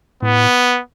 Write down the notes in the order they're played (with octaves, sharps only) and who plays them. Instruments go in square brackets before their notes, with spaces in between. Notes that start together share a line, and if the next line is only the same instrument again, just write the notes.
[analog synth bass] A2 [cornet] B3